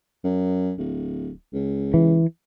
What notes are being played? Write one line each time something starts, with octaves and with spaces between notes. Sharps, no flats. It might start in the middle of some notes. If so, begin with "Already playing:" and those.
F#2
D1
C#2
E3